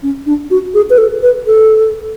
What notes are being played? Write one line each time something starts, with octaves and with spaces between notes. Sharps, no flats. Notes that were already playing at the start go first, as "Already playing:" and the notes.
C#4
D4
F#4
G#4
B4
A4
B4
A4